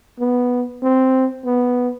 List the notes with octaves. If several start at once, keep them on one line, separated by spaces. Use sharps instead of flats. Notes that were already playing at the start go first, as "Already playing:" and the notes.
B3
C4
B3